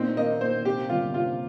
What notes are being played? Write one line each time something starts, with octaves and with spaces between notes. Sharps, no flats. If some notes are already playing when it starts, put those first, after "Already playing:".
Already playing: A#2 C4 D#4
A#3 D#5
A#2 C5
C3 G4
G1 F4
C3 F4